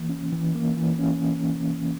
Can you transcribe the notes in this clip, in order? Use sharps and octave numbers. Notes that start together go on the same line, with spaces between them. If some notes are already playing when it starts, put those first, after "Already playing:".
Already playing: E3 A#3
C#4
E3
A#3
E3
C#4